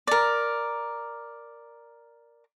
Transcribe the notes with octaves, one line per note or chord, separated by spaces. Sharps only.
A#4 D5